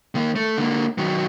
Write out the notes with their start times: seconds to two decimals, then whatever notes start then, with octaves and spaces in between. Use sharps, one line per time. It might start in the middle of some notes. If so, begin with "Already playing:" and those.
0.15 D#3 A#3
0.36 A3
0.57 D3 A#3
0.98 D#3 F#3